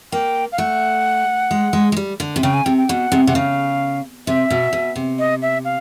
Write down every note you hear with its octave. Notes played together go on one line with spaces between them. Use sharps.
A#3 G5
F5
A3 F#5
G#3
G#3
G#3
G3
D3
C3
C#3 G5
G#5
C3 G5
G5
B2 F#5
C3
C3 F#5
C#3 F5
C3 E5
B2
B2
C3
D#5
E5
F5